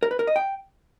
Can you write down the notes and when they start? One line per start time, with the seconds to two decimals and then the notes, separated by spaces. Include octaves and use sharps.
0.03 A#4
0.11 B4
0.19 A#4
0.27 D#5
0.36 G5